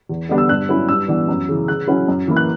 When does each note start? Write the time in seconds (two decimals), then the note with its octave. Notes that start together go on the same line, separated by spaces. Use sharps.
0.09 E2
0.29 D3 G3 B3 D4
0.38 E6
0.49 G2 F#6
0.69 F#3 C#4 E4
0.89 G2 E6
1.08 E3 B3 D4
1.28 F#2
1.48 C#3 E3
1.68 C#3 F#6
1.87 F#3 C#4 E4
2.08 F#2
2.27 E3 A#3 E4
2.36 F#6